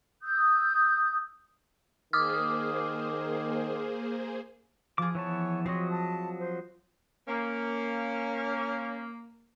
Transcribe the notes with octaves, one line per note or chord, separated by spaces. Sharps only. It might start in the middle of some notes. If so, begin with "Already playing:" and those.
D#6 E6 G6
D#3 A#3 G#4 C5 D6 D#6 F6
F3 F4 G#4 D6
E3 B3 C#5 A5
F3 F#3 C4 C#5 D#5
A5
C5
A#3 C#4